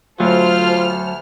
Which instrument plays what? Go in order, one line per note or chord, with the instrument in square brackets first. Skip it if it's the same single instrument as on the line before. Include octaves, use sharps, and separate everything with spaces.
[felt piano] D2 [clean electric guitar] F#3 [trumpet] F4 [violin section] A4 C5 F6